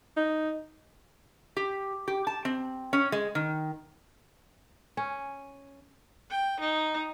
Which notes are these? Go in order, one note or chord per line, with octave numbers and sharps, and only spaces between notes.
D#4
G4
G4
A5
C4
C#4
G#3
D#3
C#4
G5
D#4